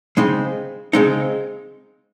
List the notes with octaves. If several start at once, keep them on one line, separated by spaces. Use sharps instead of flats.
C#3 G#3 C4 D#4
C#3 G#3 C4 D#4